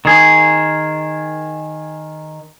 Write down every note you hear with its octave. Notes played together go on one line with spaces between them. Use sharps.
D#3 G#4